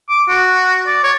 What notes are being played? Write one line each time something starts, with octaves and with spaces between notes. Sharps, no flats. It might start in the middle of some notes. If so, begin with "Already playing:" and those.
D6
F#4
D5
C#5